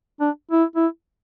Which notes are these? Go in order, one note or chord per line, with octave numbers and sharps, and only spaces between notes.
D4
E4
E4